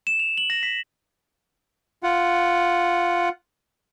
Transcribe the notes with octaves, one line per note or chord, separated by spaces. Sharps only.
E7
F7
F#7
A#6
B6
F4 F#5